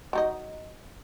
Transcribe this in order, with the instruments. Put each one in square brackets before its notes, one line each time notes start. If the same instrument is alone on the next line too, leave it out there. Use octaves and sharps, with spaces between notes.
[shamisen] F#3 D#4 D#5